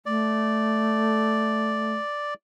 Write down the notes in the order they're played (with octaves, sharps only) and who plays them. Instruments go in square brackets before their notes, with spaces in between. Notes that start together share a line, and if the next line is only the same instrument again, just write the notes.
[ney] A3 [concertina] D5